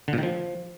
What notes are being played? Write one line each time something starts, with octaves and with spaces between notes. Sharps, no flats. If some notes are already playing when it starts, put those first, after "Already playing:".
D3
A#2
D#3
F3